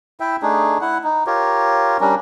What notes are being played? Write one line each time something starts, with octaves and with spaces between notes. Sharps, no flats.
E4 E5 G5
A3 D4 D#4 G#4
E4 F#5
D#4
F4 G4 A#4 C#5
G3 C#4 D4 A#4